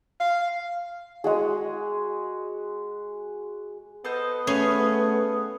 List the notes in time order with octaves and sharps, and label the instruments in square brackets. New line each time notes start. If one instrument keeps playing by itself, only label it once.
[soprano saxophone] F5
[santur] G#3 F#4 G#4
[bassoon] B3 [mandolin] A4 C5 D#5
[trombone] A3 [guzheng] C#4 [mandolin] G#4 B4 F5